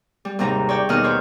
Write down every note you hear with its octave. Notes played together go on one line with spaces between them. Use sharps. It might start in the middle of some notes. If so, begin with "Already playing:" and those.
G3
D#2 G#2 C3 G3 A#5
C#5 D5 G5
D#2 B2 D#3 D#5 F#5 F6
G4 C5 C#5